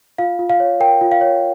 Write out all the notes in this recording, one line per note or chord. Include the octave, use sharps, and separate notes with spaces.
F4 F5
F4
F5
C#5
A#4 G5
F4
F5
C#5